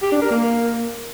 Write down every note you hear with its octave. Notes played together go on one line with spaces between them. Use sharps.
G4
D4
A#4
A#3